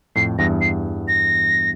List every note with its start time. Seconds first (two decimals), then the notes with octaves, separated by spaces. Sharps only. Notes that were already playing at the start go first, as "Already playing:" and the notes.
0.16 F2 A2 C7
0.39 E2 G2 A#6
0.61 C7
1.08 A#6